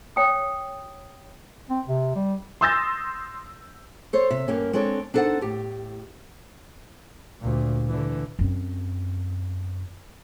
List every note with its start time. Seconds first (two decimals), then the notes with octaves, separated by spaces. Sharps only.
0.16 C#5 G5 D#6
1.70 C4
1.87 C3
2.16 G3
2.61 C6 D#6 E6 G6 A6 A#6
4.13 A4 C5 C#5
4.30 C3 E5
4.48 G2 A#3 C#4
4.73 G#3 C4 D4 A4 C#5
5.14 D4 D#4 A4 C5 F#5
5.41 A2 G4
7.41 D2 A#2
7.88 D3 E3
8.39 F#2 C4